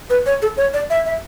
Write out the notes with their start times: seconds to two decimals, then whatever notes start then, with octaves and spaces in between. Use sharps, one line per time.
0.10 B4
0.26 C#5
0.42 A4
0.57 C#5
0.74 D5
0.90 E5
1.06 E5